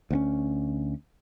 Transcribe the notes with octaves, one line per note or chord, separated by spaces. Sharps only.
D2 B3 C#4